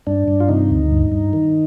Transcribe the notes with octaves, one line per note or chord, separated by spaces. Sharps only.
G2 D4
G2
F4
C3 D#4
D2
G2
G2
D#3